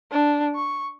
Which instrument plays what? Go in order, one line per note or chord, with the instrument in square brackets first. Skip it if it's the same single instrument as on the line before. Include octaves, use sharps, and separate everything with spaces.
[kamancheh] D4
C#6